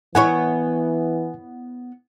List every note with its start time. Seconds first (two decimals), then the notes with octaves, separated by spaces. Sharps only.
0.15 E3 B3 E4 C#5 F#5 G#5